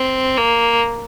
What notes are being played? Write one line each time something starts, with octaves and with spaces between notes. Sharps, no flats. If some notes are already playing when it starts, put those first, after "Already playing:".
Already playing: C4
A#3